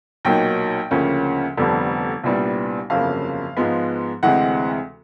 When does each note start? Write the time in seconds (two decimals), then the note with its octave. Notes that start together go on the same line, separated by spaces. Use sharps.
0.25 B1 A#2 F#3 A#3 D#4 G5
0.91 D2 C#3 F3 A#3 C#4
1.57 F1 F2 D3 G3 B3
2.23 C2 A#2 G3 B3 D4
2.90 G1 F2 C#3 F#3 A#3 F5
3.57 G#2 F3 G#3 B3
4.23 D2 C3 E3 G#3 C4 F#5